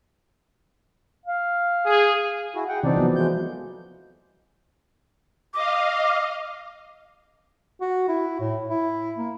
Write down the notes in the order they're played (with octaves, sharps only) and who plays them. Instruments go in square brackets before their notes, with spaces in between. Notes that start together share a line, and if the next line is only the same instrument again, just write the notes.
[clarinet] F5
[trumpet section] G#4
[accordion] E4 F#4 G#4
G#4 F#5 G5
[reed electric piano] C3 C4 [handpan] E3 [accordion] D4 D#4 D5
[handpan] F3 F#3 B3 [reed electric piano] F#4
[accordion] G#3 A3 G6
[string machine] D#5 F5 [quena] D6
[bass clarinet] F#4
E4
A2
E4
A#3